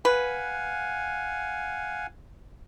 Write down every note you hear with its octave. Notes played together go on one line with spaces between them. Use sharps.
B4 F5 F#5 G#5